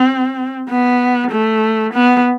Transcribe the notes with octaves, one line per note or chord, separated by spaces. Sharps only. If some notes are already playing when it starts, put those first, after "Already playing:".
Already playing: C4
B3
A3
B3